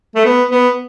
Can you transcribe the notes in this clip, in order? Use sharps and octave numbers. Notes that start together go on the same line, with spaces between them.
A3
B3
B3